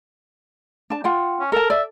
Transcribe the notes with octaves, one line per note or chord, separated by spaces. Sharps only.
D4 A5
F4 F#5 G5
C#4
A4 A#4 A5
D5 E5